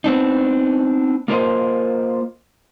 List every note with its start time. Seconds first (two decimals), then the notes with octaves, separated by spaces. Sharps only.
0.04 B3 C4 D4 D#4
1.28 A#3 F4 A#4 C5 D#5